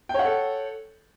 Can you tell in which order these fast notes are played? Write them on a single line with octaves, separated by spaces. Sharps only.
G5 C#5 F#5 A4